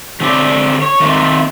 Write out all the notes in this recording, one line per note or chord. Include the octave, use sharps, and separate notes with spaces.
D3 F#3 C4 G4 D5
C#5
D#3 A3 A#3 C4